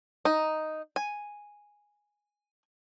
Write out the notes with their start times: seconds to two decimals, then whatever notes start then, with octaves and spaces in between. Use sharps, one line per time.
0.25 D#4
0.96 G#5